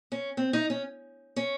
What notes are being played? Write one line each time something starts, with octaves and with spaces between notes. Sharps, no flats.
C#4
C4
D#4
C#4
C#4